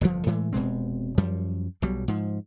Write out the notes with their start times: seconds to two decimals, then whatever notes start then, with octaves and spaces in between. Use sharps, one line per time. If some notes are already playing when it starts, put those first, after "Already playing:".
0.01 G1 F2 C3 F3
0.26 A2 E3 G#3 A3
0.53 F1 B2 G#3 C4
1.18 F#2 F3 G3
1.82 B1 B2 F#3 G3
2.08 G#2 F3